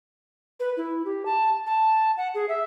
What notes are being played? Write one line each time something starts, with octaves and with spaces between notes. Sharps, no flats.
B4
E4
G4
A5
A5
F#5
G#4
E5